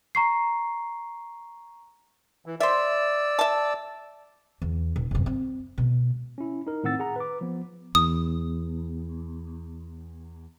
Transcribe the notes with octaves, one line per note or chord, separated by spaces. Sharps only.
A#5 C#6 C7
E3
C5 D5 E5 E6
E5 A5
E2
D#1
F1 G2
C4
B2 G#3
C#4 E4
D#4 A#4
A2 D#3 C4 F#5 E6 A6
G#4 F#5 A#5
B4 D6
F3 B3
E2 D#6